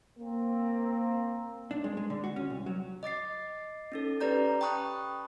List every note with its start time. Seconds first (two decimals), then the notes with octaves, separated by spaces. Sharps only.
0.19 A#3 C4
1.71 D4
1.84 G#3
1.97 G#3
2.10 D3
2.24 F#4
2.36 C#4
2.50 C2
2.66 F#3
3.03 D#5 D6 A6 C7
3.92 C#4 D#4 A4
4.20 C#4 G4 B4 D5 A#5 G6
4.61 G5 A5 B5 C#6 D#6 F#6